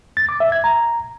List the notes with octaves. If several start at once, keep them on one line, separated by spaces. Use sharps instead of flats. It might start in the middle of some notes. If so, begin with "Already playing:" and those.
A6
D6
E5
G#6
A#5